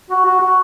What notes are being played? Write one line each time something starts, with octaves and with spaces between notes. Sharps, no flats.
F#4
F#4
F#4